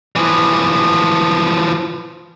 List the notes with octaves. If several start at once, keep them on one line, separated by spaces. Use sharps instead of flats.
E3 F3